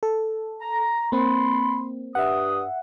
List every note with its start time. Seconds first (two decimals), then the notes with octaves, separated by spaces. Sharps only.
0.03 A4
0.62 A#5
1.12 A#3 C4 B5 C6
2.15 G2 E5 F#5 D#6